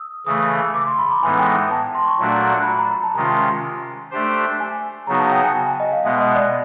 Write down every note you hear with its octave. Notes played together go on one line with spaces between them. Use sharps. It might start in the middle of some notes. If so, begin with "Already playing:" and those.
Already playing: D#6 E6
C#3 E3 A3 D#6
D6
C6
B5
A#5
A2 E3 G#3 B3 D#4 G#5
G5
A5
C6
C#6
A#2 F#3 A3 D4 F#4
B5
A#5
A#5
A#5
A5
C3 D#3 G#3 C#4 F4 A#5
A3 D4 G4 C5
G#5
C#3 F#3 B3 D#4 F#4 A#5
A5
G5
G#5
G#5
D#5
F5
B2 G#3 B3 E5
D#5
D5